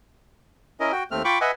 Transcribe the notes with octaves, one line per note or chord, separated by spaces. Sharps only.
C#4 E4 A#4 D#5
F#4 G5
D#2 A3 C4 F6
F4 G5 B5 C#6 D6
B4 D#5 E5 F#5 G#5